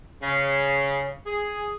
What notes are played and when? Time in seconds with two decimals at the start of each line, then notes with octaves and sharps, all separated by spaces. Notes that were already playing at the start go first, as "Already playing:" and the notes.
0.23 C#3
1.26 G#4